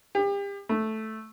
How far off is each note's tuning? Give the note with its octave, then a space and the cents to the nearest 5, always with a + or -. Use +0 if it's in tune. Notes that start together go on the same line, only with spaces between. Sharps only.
G4 +35
A3 -5